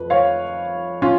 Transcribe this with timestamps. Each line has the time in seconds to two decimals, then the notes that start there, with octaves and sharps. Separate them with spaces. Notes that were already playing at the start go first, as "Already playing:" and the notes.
Already playing: F2 B4
0.10 C#5 F5
1.02 C#4 F4